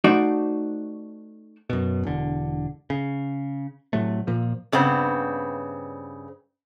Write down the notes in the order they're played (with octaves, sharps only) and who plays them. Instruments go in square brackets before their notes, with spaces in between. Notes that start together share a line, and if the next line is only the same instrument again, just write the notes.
[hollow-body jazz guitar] A3 D#4 F#4 C5 D5
[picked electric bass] F#2 B2
E1 D3
C#3
A2 C3 F#3 A3
A#2 F3
[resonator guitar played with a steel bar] G2 C#3 B3 C4